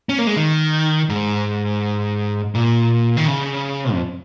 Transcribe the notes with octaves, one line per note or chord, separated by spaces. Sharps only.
C#4
A#3
G#3
D#3
G#2
A#2
D#3
C#3
F2